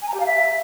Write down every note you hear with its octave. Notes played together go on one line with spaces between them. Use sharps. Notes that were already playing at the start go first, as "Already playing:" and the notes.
G#5
A#5
G4
F5
E5